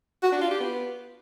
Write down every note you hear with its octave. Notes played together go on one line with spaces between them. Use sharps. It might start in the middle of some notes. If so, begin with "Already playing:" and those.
F#4
D4
F4
G4
B3